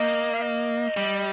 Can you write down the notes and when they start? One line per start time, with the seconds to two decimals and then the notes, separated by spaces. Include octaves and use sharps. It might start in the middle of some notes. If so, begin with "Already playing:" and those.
Already playing: A#3 D#5
0.34 F5
0.42 D#5
0.97 G3